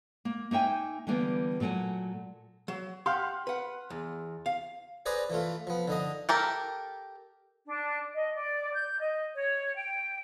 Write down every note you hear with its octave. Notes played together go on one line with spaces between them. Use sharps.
A#3
A#3 D#4 E5 G5 G#5
D3 E3 G3 A#3 B3
A#2 F#3 A3 F#5 G#5
F#3
G4 F5 F#5 C6 F6 F#6
B4 F#5
E2
F5
G#4 B4 C5 D5 G#5 A#5
E3 A3 F4
F3 B3
D3 D#4 D#5
G4 A4 A#4
D4
D#5
D5
G6
D#5
C#5
G5